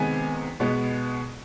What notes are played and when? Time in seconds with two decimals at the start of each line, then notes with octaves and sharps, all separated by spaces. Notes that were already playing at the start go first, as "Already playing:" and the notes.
Already playing: C3 D#3 G#3 B3 G#5
0.60 B2 G#3 B3